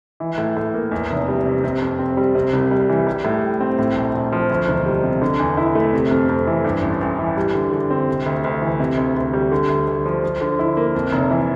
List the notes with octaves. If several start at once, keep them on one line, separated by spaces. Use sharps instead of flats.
E3
A2
A2
A#3
E2
F1
G3
C3
C3
F2
C4
G3
C3
C2
G3
E3
G3
A2
G4
C4
A2
A#1
A#1
F3
D2
E1
G3
C3
D3
E2
E4
A3
C3
F2
F2
E3
G2
A1
A1
E3
G3
D3
D3
C4
C3
D2
D2
E3
C3
D2
D2
G3
D3
D2
D2
F3
F3
D3
E4
A#3
F2
F1
E3